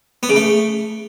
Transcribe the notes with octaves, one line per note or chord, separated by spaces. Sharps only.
B3
C#3
A3